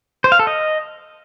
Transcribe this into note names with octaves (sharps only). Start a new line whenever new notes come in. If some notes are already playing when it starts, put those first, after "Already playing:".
C5
F5
A4
D#5